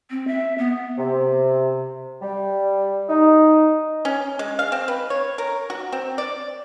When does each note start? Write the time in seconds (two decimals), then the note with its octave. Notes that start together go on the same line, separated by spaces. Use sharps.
0.10 C4
0.27 E5
0.58 B3
0.98 C3
2.22 G3
3.09 D#4
4.05 C#4
4.39 G#3
4.59 F5
4.72 C4
4.88 B4
5.10 C#5
5.38 A#4
5.70 F#4
5.92 C4
6.18 D5